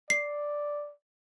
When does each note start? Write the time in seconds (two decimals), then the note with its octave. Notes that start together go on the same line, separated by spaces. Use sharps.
0.10 D5 C7